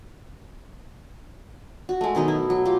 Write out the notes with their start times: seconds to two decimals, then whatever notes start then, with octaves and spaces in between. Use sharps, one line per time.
1.89 F#4
2.01 G#3 A3
2.15 B2 D#3 F#3 D#4
2.28 E4
2.50 F#3
2.65 F4 G4